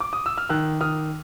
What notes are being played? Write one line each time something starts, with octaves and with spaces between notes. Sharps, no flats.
D6
D#6
E6
F6
D#3 E6 F#6
D#3 D#6 F6